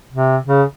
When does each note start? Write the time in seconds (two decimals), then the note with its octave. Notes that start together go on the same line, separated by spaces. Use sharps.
0.13 C3
0.47 C#3